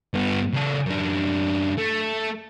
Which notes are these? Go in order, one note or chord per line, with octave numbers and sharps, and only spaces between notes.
G2 B3
C#3 A4
F#2 D4
A3